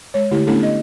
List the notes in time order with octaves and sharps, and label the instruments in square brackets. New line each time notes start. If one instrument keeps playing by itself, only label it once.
[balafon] G#3 C#5
D3 A3 E4 G4
A3 B3 C#4 D4 E4 A4
D#5